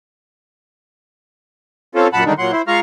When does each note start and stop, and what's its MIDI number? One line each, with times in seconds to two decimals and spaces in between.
1.95 2.08 60
1.95 2.08 61
1.95 2.08 65
1.95 2.08 69
2.13 2.24 42
2.13 2.24 46
2.13 2.24 78
2.13 2.24 81
2.13 2.24 83
2.26 2.33 50
2.26 2.33 51
2.26 2.33 55
2.26 2.33 56
2.26 2.33 62
2.26 2.33 63
2.38 2.52 46
2.38 2.52 54
2.38 2.52 78
2.38 2.52 84
2.52 2.62 64
2.52 2.62 72
2.68 2.80 56
2.68 2.80 65
2.68 2.80 77
2.68 2.80 82
2.68 2.80 85
2.68 2.80 89